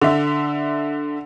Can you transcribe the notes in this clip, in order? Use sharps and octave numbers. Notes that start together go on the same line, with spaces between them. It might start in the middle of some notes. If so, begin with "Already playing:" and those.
D3 E5